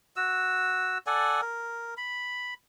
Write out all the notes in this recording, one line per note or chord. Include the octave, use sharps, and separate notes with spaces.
F#4 E6
A4 D5 F#5 G#5
A#4
B5